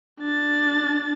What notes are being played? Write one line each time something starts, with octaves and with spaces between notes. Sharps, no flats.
D4 A6